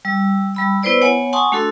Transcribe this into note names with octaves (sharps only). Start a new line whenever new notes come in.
G3 E6
G3 B5 E6
B3 E4 B4 C5 D5 E6
B3 C#5 F#5 G#5
F#5 G#5 A5 C6 C#6 D#6
A3 D4 F#4 A4 C6 E6